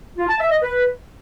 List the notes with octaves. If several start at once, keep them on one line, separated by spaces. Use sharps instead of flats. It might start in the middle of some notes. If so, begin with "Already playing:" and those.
F4
A5
E5
D#5
B4